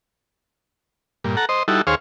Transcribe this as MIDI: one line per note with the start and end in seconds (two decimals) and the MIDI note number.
1.24 1.36 43
1.24 1.36 46
1.37 1.45 69
1.37 1.45 78
1.37 1.45 82
1.49 1.63 72
1.49 1.63 75
1.68 1.81 55
1.68 1.81 63
1.68 1.81 64
1.68 1.81 66
1.68 1.81 69
1.87 1.95 39
1.87 1.95 68
1.87 1.95 72
1.87 1.95 73
1.87 1.95 77